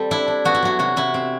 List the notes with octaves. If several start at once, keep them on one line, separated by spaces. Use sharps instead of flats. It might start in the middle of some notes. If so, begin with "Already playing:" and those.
Already playing: G3 C4 A4
D4 E4
D4
B3 F#4
E4
F#3 F#4
C3 F#4
C3 E4
C4